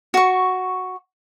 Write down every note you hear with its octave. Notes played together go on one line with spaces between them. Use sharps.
F#4 C#6